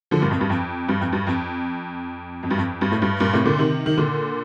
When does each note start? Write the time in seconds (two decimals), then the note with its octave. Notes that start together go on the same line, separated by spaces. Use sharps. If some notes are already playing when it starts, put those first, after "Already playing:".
0.11 D3 F3
0.21 G2 A#2
0.30 F2
0.41 G2
0.50 F2
0.89 G2
1.01 F2
1.12 G2
1.27 F2
2.43 F2
2.50 G2
2.57 F2
2.81 G2
2.91 A2
3.02 G2
3.20 G2 A#2
3.33 A2 C3
3.45 A#2 D3
3.59 C3 D#3
3.86 D#3
3.97 A#2 D3